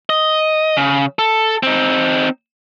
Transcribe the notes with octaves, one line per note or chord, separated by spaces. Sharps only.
D#5
C#3
A4
C4 D#4